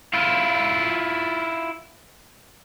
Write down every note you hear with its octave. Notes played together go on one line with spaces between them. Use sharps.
E4 F4